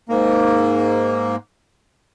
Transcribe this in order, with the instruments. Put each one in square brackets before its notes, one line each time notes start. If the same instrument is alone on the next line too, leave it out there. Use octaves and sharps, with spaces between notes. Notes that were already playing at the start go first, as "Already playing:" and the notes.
[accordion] G#2 A#3